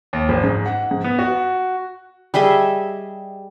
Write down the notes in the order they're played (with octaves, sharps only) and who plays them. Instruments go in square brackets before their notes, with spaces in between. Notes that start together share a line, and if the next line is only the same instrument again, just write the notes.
[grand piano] D#2
G#1
G#2
F#5
G#2
B3
F#4
[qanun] G3 G#4 D#5 E5